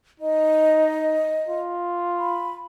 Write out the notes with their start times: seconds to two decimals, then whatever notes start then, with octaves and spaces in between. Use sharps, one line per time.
0.20 D#4 D#5
1.49 F4
2.19 B5